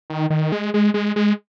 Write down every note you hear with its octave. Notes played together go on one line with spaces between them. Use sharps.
D#3
D#3
G#3
G#3
G#3
G#3